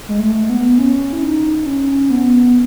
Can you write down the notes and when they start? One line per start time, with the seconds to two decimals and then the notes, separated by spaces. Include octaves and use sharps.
0.09 G#3
0.20 A3
0.49 B3
0.78 C#4
1.13 E4
1.23 D#4
1.66 C#4
2.10 B3